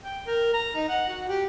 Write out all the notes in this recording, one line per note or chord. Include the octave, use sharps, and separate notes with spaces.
G5
A#4
A#5
D#4
F#5
F#4
G4